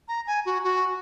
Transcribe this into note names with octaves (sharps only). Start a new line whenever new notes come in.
A#5
G#5
F#4
F#4